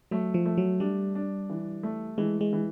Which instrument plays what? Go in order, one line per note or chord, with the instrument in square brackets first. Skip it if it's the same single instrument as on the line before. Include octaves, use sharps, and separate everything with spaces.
[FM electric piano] F#3 [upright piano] A3
[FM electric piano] F3
[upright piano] A3
[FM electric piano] F#3
[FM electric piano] G3 [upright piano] D4
[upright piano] D4
E3
A3
[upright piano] E3 [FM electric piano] G#3
[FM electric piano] G#3
[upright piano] E3